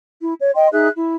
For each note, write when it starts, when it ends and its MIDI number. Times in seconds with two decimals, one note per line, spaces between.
0.20 0.33 64
0.41 0.52 73
0.56 0.68 75
0.56 0.68 79
0.56 0.68 84
0.72 0.88 63
0.72 0.88 68
0.72 0.88 76
0.72 0.88 90
0.97 1.16 64